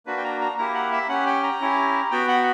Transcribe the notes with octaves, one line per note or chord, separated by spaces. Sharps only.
A#3 D4 F#4 B4
G5
A#5
A#5
A#3 E4 G4 A#5
F#5
E5
C#4 G4 F#5
G5
A#5
C#4 E4 G4
B3 F#4 G5
F#5